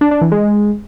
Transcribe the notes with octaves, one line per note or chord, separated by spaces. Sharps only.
D4
D4
E3
G#3